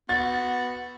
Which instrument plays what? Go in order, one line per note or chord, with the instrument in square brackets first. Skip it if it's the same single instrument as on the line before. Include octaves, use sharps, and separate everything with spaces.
[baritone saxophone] B3 [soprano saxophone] F#4 [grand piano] A6